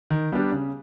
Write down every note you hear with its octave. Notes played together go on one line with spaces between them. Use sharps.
D#3
G3 B3 D4 G4
C#3